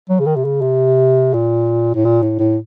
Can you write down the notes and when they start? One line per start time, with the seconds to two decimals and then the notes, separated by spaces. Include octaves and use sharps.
0.09 F#3
0.20 C#3
0.26 D#3
0.36 C3
0.45 C#3
0.62 C3
1.34 A#2
1.95 A2
2.05 A#2
2.22 A2
2.39 A2